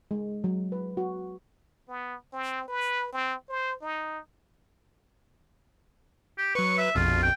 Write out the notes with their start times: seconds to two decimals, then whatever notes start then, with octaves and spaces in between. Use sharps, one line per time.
0.11 G#3
0.44 F#3
0.72 B4
0.97 F#4
1.89 B3
2.33 C4
2.68 B4
3.13 C4
3.49 C5
3.82 D#4
6.38 G4
6.55 F#3 B4 C#6
6.78 E5
6.95 A#1 F2 B2 F4
7.23 G5